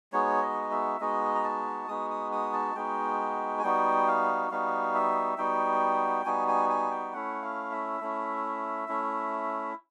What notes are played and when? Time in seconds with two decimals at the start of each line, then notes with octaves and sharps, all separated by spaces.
0.13 G#3 B3 D#4 F#4 C#5
0.42 D#5
0.71 E5
1.00 G#3 B3 D#4 F#4 D#5
1.35 A#5
1.44 A5
1.88 G#3 B3 D#4 F#4 D#6
2.10 D#6
2.32 D#6
2.53 A5
2.75 G#3 B3 D#4 F#4 G5
3.59 G#5
3.62 G3 B3 D#4 F#4 G5
4.07 F5
4.51 G3 B3 D#4 F#4 F5
4.95 E5
5.38 G3 B3 D#4 F#4 G5
6.25 G3 B3 D#4 F#4 G#5
6.48 G#5
6.70 G#5
6.91 G5
7.13 A3 C#4 E4 F#5
7.42 F5
7.72 E5
8.01 A3 C#4 E4
8.88 A3 C#4 E4